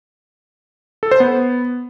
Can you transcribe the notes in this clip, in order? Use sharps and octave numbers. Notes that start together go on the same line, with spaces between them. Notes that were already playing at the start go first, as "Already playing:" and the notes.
A4
C5
B3